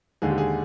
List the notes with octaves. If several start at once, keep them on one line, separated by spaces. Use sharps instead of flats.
D#2 D3 G#3 G#4
G4
G#4